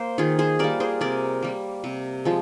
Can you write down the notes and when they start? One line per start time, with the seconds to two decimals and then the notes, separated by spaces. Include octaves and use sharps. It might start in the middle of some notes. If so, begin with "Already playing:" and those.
Already playing: A#3 C5
0.18 D#3 F4 G#4
0.39 G#4 C5
0.59 G3 A#3 A#4 D5
0.80 G#4 C5
1.01 C3 A#4 D5
1.43 G3 A#3
1.84 C3
2.25 F3 G#3